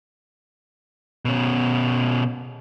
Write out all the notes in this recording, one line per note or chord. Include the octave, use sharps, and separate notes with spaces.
B2 C#4